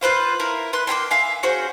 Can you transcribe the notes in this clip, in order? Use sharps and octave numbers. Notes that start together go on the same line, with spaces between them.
F4 B4 C5 F5
E4 A#4
B4 C6 F#6
A#3 E4 G5 C6
E5 F5 G#5
C#4 F#4 G#4 C5